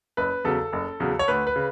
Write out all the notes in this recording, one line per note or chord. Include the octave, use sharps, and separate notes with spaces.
F#1 B4
E2 C#3 F#3 A4
F#1
E2 C#3 F#3
C#5
D2 B4
B4
C#3